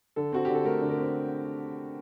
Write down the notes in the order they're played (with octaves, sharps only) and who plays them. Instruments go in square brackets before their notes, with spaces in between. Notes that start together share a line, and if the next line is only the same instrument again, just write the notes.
[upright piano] D3 A4
C4 F#4
D3 G4
A4
A3 A#4
D3
A#4
C4